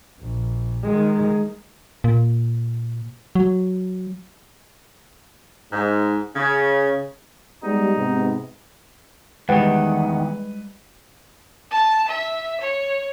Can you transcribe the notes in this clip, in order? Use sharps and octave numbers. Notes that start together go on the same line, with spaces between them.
A#1
D#3 G#3
A#2
F#3
G#2
C#3
G3 G#3 B3 D#4
G#2 C3 B3
E2 D#3 G3 G#3 B4 F#5 G5
A5
E5
C#5